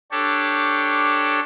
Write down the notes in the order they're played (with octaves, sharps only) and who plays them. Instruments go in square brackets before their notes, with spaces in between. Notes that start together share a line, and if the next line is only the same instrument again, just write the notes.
[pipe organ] D4 G4 A4 C#5